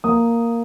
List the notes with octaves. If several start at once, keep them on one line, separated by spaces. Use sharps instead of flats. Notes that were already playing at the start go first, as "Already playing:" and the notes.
A#3 D#6